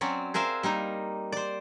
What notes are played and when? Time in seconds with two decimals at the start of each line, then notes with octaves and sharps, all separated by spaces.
0.01 F#3 C4 C#4 D5
0.34 G#4 A#4 C5 E5 F5
0.63 G3 A#3 D#4
1.32 C5 D5